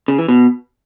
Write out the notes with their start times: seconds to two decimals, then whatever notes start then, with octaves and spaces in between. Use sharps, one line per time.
0.08 C#3
0.18 E3
0.28 B2